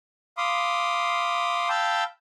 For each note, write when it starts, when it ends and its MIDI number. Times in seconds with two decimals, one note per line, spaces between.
0.38 1.69 77
0.38 1.69 83
0.38 1.69 84
0.38 1.69 86
0.38 1.69 87
1.69 2.04 77
1.69 2.04 79
1.69 2.04 81
1.69 2.04 83
1.69 2.04 88
1.69 2.04 91